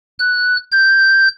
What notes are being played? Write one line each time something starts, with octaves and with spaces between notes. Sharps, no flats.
F#6
G6